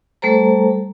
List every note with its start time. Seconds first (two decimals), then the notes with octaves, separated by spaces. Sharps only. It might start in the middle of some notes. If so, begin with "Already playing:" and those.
0.22 G3 A3 A4 C5 A#5